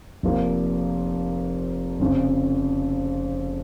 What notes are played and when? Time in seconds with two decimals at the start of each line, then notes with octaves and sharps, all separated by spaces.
0.23 F1 F2 F3 A#3
2.00 F1 F2 C#3